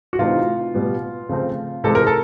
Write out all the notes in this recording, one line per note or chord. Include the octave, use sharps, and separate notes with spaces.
F#4
C3 E3 A3 C4 D#4 F4
B2 G3 B3
C#3 F3 A3 C4
C3 E3 G#3 A4
A#4
A4